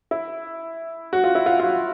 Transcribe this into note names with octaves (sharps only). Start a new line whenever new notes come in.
E4
F#4
F4
E4
F4
F4
F#4